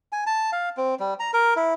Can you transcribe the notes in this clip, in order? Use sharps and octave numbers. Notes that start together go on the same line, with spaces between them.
G#5
A5
F5
C4
G3
A#5
A#4
E4